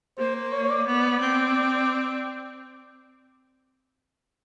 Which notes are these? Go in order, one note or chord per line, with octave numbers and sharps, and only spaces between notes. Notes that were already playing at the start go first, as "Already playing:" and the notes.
A#3 C5
C5
C#5
C#5
D5
B3 D5
C4